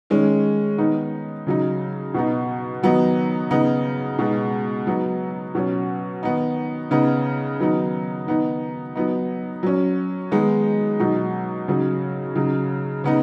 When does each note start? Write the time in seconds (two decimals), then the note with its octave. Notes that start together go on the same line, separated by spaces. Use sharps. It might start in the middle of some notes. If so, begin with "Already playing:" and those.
0.10 D#3 G#3 C#4
0.78 D#3 B3 D#4
1.46 C#3 F#3 D#4
2.14 B2 B3 D#4
2.83 D#3 F#3 B3 D#4
3.51 C#3 B3 D#4
4.19 B2 G#3 B3 D#4
4.87 F#3 B3 D#4
5.55 B2 F#3 C#4
6.23 D#3 B3 D#4
6.91 C#3 B3 D#4
7.59 D#3 F#3 B3 D#4
8.27 D#3 B3 D#4
8.96 F#3 B3 D#4
9.63 F#3 C#4
10.31 D#3 G#3 B3 D#4
11.00 B2 F#3 D#4
11.68 C#3 F#3 D#4
12.35 C#3 F#3 D#4
13.04 C#3 B3 D#4